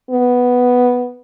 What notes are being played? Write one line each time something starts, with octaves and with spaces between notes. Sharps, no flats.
B3